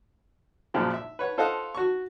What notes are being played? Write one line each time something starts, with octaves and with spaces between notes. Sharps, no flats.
F#2 A#2 C#3 F3 G#3
E5
B4 C#5 F#5
F4 A4 C5 D#5 F5 F#5
F#4 C#6